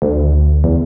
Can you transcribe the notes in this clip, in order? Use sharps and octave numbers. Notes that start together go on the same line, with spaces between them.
D2
E2